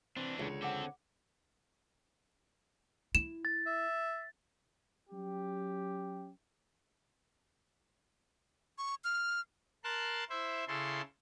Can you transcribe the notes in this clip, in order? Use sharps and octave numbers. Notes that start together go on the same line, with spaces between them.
E3 C4 D4
C#2 D3 C#5
C4 A4 F#5 D6
E4 E7
A6
E5
F#3 C#4 G4
C#6
F6
A#4 A5 C6 F#6
E4 C5 E5
C#3 E4 A4 C6